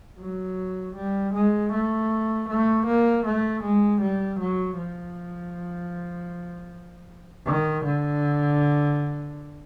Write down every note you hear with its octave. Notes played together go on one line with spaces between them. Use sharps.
F#3
G3
G#3
A3
A3
A#3
A3
G#3
G3
F#3
F3
D#3
D3